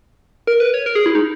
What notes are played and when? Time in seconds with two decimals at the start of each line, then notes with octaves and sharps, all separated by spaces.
0.47 A#4
0.60 B4
0.74 C#5
0.86 A#4
0.95 G#4
1.06 E4
1.15 D#4